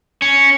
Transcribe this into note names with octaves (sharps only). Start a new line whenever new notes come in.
C#4